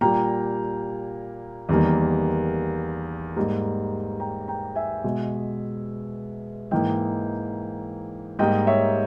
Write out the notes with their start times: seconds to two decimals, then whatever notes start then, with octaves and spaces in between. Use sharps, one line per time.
0.01 A#2 G3 A#3 G5 A#5
1.69 E2 D#3 G3 A#3
3.36 G#2 G3 A#3
4.20 G5 A#5
4.48 G5 A#5
4.76 E5 G#5
5.04 B2 G#3
6.71 G#2 E3 A#3 D#5 G5
8.39 G#2 G3 A#3 D#5 G5
8.67 C#5 E5